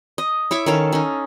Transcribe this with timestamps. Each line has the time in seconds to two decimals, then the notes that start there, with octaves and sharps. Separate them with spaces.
0.18 D#5
0.51 E4 C#5 E5 D6
0.66 D#3 C#4 A4 F5
0.92 C#4 D#4